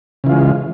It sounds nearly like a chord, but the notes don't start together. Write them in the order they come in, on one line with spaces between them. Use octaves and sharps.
C#3 E3 F4 G#3